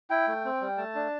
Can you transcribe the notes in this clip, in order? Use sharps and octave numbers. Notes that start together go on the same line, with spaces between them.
E4 G5
A3
C4
G3
A3 A5
D4